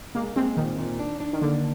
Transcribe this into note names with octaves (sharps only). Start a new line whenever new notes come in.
G#3 A#3
G#3 C4
A#2 D#3
A#2
D4
D4
D#3
D3 A#3